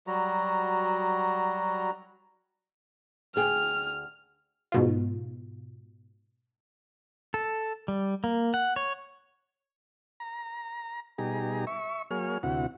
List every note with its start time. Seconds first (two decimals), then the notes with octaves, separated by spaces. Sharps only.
0.07 F#3 G3 F#4 A#5
3.36 D2 G#4 G5 F6
4.72 G#2 B2 F4
7.34 A4
7.88 G3
8.24 A#3
8.54 F#5
8.76 C#5
10.20 A#5
11.18 B2 G3 D#4 G4 G#4 A#5
11.67 E5 C#6
12.11 F#3 A#3 G#4 C#5 F6
12.43 D2 C3 E4 F#4 F#5